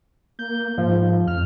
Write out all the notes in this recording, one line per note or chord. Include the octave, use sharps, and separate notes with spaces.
A#3 G6
G#2 F3
F2 F6